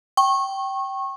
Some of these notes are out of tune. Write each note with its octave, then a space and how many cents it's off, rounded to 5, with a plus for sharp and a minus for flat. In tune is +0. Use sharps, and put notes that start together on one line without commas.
G5 -15 C#6 -25